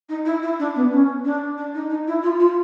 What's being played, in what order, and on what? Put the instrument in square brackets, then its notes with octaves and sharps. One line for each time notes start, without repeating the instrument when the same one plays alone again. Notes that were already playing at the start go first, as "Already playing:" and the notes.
[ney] D#4
E4
E4
D4
B3
C#4
D4
D4
D#4
D#4
E4
F4
F4